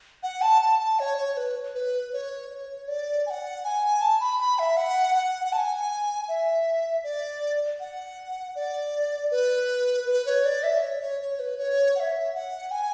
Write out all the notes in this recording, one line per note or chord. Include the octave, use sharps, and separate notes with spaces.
F#5
A5
A5
A5
C#5
C#5
B4
B4
C#5
C#5
D5
G#5
F#5
G#5
A5
B5
B5
E5
F#5
F#5
F#5
A5
G#5
E5
D5
F#5
D5
B4
B4
C#5
D5
E5
C#5
C#5
C#5
B4
C#5
F#5
E5
F#5
G#5